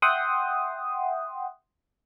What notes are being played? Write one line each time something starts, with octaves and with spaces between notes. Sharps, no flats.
E5 F#5 G5 C6 D#6